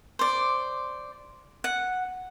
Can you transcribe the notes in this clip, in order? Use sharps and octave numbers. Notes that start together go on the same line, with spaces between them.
C5 D5
F#5